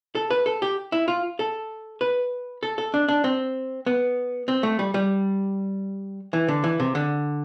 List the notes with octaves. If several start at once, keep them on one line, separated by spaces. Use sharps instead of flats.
A4
B4
A4
G4
E4
F4
A4
B4
A4
A4
D4
D4
C4
B3
C4
A3
G3
G3
E3
D3
E3
C3
D3